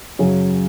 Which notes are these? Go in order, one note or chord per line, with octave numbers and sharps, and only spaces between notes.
F#2 C#3 F#3 C#4 G#4